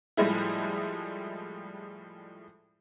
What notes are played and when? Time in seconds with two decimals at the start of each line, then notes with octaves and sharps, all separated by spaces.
0.17 A2 F3 G3 G#3 E4